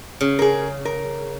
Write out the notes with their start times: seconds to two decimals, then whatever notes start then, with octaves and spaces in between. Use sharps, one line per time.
0.21 C#3
0.39 G#4 A#4
0.85 A#4